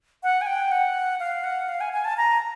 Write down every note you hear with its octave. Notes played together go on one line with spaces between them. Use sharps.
F#5
G#5
G5
F#5
F5
F#5
F5
G#5
G#5
A5
A#5